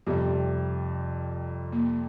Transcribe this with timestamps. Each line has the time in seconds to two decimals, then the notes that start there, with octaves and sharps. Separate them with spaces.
0.07 F2 C3 G3 G4
1.72 A#3